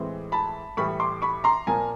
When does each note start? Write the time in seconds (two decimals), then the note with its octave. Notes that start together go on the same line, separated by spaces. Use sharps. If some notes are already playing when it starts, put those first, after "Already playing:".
Already playing: A2 E3 G#3 C4
0.32 A5 B5
0.77 A2 E3 G3 B5 C#6
1.00 C6 D6
1.22 B5 C#6
1.44 A#5 C6
1.67 A#2 F3 A#3 G#5 A#5